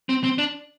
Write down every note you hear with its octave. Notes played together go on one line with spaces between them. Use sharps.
C4
C4
D4